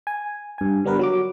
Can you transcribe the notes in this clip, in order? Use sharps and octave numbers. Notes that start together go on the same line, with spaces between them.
G#5
G2 G#5
D3 G3 B3 A#4 B4
F#3 F#4 D6